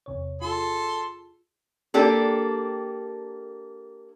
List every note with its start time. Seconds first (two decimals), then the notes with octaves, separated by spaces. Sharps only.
0.06 E2 C3 C#5
0.41 F4 G#4 A4 C6
1.94 A#3 D4 G4 A4